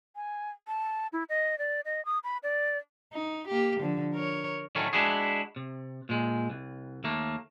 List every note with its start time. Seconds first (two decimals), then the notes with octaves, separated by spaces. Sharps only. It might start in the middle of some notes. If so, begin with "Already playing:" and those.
0.16 G#5
0.67 A5
1.13 E4
1.29 D#5
1.58 D5
1.85 D#5
2.05 D#6
2.24 B5
2.43 D5
3.13 D#4
3.48 A#3 G4
3.80 D3 F3
4.14 A#4 C#5
4.75 A2 D3 D#3 F#3 A3 C#4
4.93 G#3 D4 E4 F#4 G#4
5.56 C3
6.09 A#2 G#3
6.50 C2
7.04 D#2 A3 A#3